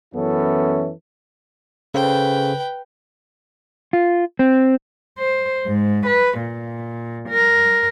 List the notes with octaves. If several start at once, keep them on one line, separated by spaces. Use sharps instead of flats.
F#2 E3 B3 C#4 E4 A4
C#3 A4 B4 C5 G5
F4
C4
C5
G#2
B4
A#2
A#4